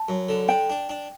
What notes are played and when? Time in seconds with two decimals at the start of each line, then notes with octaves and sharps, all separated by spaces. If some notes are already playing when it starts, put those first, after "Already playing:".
Already playing: A5
0.08 F#2
0.29 D3
0.48 D4 G5
0.70 D4
0.89 D4